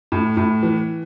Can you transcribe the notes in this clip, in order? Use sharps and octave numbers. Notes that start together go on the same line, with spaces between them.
A2
A2
E3